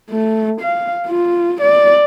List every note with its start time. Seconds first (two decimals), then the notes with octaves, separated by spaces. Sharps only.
0.11 A3
0.61 F5
1.07 F4
1.61 D5